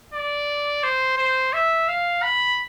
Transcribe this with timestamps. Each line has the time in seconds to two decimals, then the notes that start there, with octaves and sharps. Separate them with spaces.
0.14 D5
0.84 C5
1.18 C5
1.53 E5
1.88 F5
2.22 B5